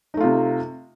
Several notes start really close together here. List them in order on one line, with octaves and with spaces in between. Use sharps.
D#4 A3 F4 C3